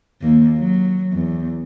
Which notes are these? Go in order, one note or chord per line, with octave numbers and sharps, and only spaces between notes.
D#2 A#3
F#3
E2